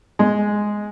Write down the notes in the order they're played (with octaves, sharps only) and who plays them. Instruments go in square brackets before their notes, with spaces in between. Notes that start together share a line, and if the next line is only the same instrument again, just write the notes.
[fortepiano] G#3